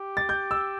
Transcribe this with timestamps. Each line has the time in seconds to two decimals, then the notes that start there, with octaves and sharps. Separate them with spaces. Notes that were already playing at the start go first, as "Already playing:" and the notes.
Already playing: G4
0.17 A6
0.29 G6
0.51 E6